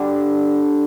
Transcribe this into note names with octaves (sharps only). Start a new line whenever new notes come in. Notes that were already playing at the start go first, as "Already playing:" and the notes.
Already playing: D3 G3 D4